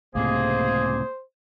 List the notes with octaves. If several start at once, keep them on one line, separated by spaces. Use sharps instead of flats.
C#2 A2 C3 G#3 A#3 G#4 C5